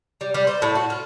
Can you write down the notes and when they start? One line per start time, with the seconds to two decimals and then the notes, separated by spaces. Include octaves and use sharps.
0.21 G3
0.34 G3
0.47 C5
0.62 A2
0.75 F#4
0.90 F4